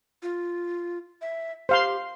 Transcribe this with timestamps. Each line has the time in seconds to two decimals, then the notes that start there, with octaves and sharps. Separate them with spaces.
0.23 F4
1.22 E5
1.69 G4 C5 F5 C6